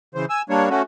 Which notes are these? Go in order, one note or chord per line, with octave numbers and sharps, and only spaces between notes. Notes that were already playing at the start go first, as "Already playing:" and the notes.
C#3 E3 C5
G#5 E6
G3 A#3 D4 C#5
A3 C#4 F#4